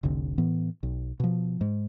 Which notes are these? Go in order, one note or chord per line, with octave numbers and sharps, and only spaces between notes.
F1 C2 D3
A2 E3 B3
B1
B2 F3
G#2